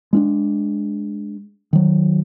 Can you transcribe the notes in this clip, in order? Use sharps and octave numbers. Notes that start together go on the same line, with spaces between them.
G#3 C#4 D4
D#3 F#3